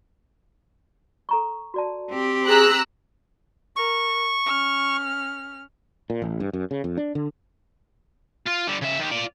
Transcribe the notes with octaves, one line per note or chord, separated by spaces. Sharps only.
A4 A#5 C#6
F#4 D5 A5
C4 G4
G#4 A#5 E6 F#6
A#4 C#6
C#4 F6
A#2
A1
G2
F#2
C#3
F2
D4
D3
F4
D3 G3
C#3 E5
D#3 G4
F4 D5